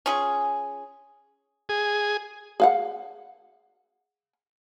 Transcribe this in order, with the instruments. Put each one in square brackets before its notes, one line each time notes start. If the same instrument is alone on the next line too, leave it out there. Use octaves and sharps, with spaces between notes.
[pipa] C#4 F4 G#4
[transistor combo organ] G#4
[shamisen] G#4 F5 F#5